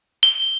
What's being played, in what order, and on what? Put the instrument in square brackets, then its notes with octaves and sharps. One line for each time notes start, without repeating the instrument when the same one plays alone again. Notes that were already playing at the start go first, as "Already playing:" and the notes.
[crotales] G7